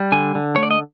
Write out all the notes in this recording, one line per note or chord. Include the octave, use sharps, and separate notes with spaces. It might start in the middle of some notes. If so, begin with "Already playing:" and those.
Already playing: G3
D3 G#5
D3
A3 C#5
D5
D#5